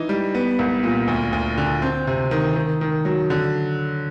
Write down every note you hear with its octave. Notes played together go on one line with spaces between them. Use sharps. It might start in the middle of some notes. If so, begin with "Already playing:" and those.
Already playing: E3 D#4
G3
B3
C2
A#2
D2
D2
D3
C4
C3
D#3
D#3
D#3
F#3
D3